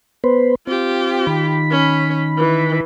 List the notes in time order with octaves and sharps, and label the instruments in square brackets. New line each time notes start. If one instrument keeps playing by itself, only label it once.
[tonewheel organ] B3 B4 C5
[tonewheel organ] C4 [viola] F4 G4
[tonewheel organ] D#3 B5
[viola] C#4
E3